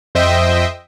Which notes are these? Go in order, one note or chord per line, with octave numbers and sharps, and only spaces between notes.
F2 C5 D#5 E5 G5